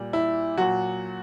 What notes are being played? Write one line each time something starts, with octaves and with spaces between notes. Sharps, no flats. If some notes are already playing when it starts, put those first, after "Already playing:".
Already playing: A#2 G3
E4
A#2 F#3 F#4